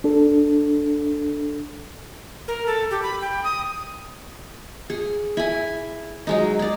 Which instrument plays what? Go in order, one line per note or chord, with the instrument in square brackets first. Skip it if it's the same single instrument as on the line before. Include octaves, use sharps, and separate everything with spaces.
[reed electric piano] D4 A4
[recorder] A#4
A4
G4
B5
G5
D#6
[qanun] G#4
E4 G#5
F#3 G#3 D#4
G#4 D5